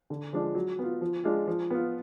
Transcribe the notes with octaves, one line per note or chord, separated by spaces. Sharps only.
D3
F3 G#3 D4
F#3
B3 F4
F3
G#3 D4 F4
F3
B3 F4